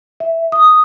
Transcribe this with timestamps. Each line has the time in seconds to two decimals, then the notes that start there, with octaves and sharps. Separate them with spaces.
0.20 E5
0.52 D#6